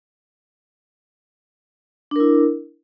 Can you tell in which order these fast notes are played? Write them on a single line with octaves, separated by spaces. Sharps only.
D4 A#4 E4